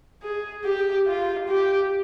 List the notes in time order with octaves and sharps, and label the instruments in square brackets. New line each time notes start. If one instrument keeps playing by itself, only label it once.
[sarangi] G#4
G4
F4
G4